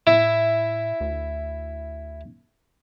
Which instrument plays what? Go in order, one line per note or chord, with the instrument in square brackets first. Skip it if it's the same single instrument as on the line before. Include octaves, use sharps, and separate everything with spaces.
[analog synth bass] A2 [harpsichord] E4
[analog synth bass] D2